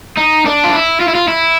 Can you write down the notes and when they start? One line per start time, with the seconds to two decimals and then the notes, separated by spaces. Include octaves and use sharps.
0.17 D#4
0.46 D4
0.64 F4
0.73 E4
1.01 F4
1.08 E4
1.15 F4
1.28 E4